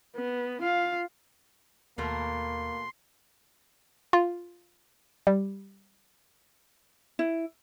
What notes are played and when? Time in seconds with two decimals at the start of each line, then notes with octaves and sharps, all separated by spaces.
0.16 B3
0.62 F4 F5
1.98 D#2 B2 A3 A#3 A#4 C6
4.13 F4
5.27 G3
7.19 E4